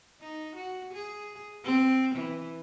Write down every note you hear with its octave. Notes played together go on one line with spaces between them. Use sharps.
D#4
F#4
G#4
C4
E3